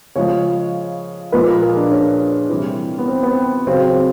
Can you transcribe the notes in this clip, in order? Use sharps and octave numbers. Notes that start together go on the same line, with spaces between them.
C#3 F3 G#3 C#5
A#2 F3 G#3 B4
A#4
G#4
D4
C#4
C3 E3 G3
B3
C4
B3
C4
C#3 F#3 C4
C4